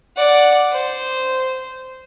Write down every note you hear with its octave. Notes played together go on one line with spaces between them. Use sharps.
D5 F#5
C5